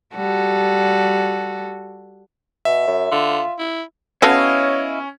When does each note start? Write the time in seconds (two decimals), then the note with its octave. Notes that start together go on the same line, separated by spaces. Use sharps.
0.15 G3 F#4 A4
2.65 B2 E5
2.87 F#2
3.11 D3 F4
3.59 E4
4.22 B3 C#4 E4 F#4 A4 C#5 D#5 F5